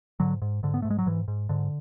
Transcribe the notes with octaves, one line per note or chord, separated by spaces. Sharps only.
G#2 D3 F#3
G#2
G#2 D3
B3
G#2 A3
G#3
F#3
G#2 E3
G#2
G#2 D3